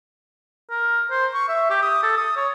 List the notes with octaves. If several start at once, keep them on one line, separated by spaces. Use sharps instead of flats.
A#4
C5
C#6
E5
G4
D#6
A4
D#6
C#5